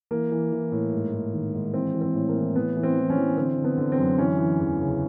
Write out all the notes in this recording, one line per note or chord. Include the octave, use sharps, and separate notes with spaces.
E3 A#3
E3
E3
A2
G#2
G#2
D#3
G#2
E3 C4
E3
C4
A2
A#3
E3
A2 B3
E3
C4
E3
C#4
E3
D3 C4
D3
B3
D3
C4
F#2
E3 C#4
E3
E2
C#3